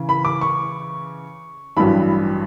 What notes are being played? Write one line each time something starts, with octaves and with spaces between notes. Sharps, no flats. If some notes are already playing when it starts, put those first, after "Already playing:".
Already playing: C#3 E3
B5
D6
C#6
A1 G2 F#3 B5